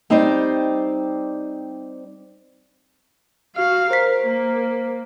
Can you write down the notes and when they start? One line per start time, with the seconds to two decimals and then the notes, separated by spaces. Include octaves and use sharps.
0.10 G3 C4 D#4 C5 D5
3.56 F#4 F5
3.91 A#4 C5 B6
4.26 A#3